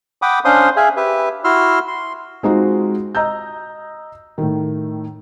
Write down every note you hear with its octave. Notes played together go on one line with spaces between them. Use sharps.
F#5 G5 B5 D6 D#6
C#4 D4 C5 F5 C6 D#6
G#4 E5 F5 G#5
G4 B4 E5
E4 F#4 C6 E6 F6
C6
G#3 C4 D#4 F4 F#4
D#5 A#5 E6 G6
A2 D#3